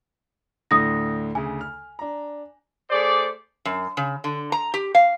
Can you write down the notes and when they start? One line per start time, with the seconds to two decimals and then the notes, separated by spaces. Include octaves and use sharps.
0.71 D2 A2 D3 D#6 A#6
1.35 D2 C#3 G#5
1.61 F6
1.99 D4 A#5
2.90 A3 G#4 C5 D5
3.65 F#2
3.97 C#3
4.24 D3
4.52 A#5
4.74 G4
4.95 F5